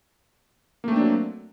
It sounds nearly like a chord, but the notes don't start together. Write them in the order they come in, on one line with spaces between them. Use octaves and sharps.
A#3 A3 C4 D4 F#3